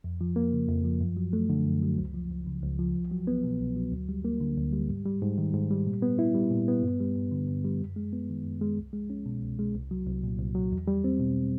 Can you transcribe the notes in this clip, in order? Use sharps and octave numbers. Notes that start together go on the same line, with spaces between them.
F2
F3
A#3
C#3
F2
F3
F#2
F#3
A3
D3
F#2
F#3
C#2
F3
C#2
C#3
C#2
F3
C2
F#3
B3
B2
C2
F#3
D2
G3
A#3
D3
D2
G3
G#2
G3
G#2
D#3
G#2
G3
A#2
B3
E4
G3
A#2
B3
G2
G3
G2
D3
G2
G3
F#2
G#3
B3
D#3
F#2
G#3
C2
G#3
C#4
B2
C2
G#3
C2
F#3
C2
A#2
C2
F#3
E2
G3
C4
B2